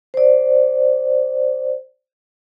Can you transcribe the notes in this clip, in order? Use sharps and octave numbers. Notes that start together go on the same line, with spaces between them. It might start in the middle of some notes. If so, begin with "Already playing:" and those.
C5 D5